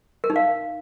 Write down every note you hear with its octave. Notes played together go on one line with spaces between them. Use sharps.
A#4
D#4
F5